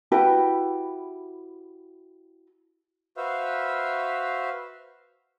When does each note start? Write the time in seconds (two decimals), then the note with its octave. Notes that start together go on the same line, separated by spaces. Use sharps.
0.12 E4 F#4 G4 B4
3.17 F#4 B4 C5 E5 F5